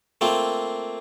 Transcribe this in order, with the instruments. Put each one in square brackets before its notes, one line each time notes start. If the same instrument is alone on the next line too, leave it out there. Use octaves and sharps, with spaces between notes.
[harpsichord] A3 A#3 C4 F4